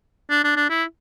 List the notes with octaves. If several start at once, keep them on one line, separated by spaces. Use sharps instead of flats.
D4
D4
D4
E4